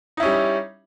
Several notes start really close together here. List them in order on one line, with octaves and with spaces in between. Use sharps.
D#4 E4 C#4 G3